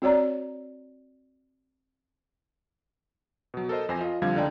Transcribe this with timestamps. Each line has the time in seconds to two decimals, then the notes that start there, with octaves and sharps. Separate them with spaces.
0.02 C4 F#4 C#5 D5 A#5
3.54 B2 F#3
3.69 A4 A#4 C5 D#5
3.89 F2 C5 G#5 A#6
4.01 F4 D#5
4.22 F2 D3 F3 G3 F5 G#6
4.35 C#2 D3 D#4 D5 G5